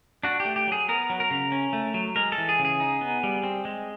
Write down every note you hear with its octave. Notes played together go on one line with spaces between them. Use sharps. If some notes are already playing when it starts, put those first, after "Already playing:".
D4 F#4
G4
A3
G4
F#3 G#4
B3 A#4
F#3
A#4
C#3
C#4
A3
F#3
G#3 A#4
A4
E3
G#4
C#3
G#4
D#4
B3
G3
C4
G#3